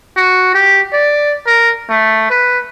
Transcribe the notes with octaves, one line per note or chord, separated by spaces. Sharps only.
F#4
G4
D5
A#4
A3
B4